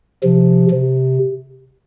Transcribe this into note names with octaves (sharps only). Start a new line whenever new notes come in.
C3 F3
C3